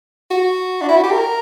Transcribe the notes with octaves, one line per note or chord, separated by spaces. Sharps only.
F#4
D4
E4
F#4
G4
A#4